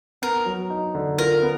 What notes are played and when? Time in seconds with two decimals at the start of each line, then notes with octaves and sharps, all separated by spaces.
0.22 B3 A#4
0.46 F#3
0.70 D#4
0.95 D3
1.18 F4 A#4
1.42 B3